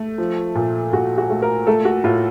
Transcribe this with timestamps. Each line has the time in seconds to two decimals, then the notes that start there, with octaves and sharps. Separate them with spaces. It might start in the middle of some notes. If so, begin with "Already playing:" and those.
Already playing: A3
0.18 F3
0.55 A#2
0.93 A#2 F#4
1.18 F#4
1.30 A3
1.42 A#4
1.67 A3 A4
1.85 F#4
2.04 A2 F4